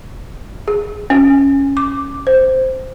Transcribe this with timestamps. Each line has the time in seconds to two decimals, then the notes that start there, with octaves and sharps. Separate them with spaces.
0.68 G#4
1.10 C#4
1.77 D6
2.27 C5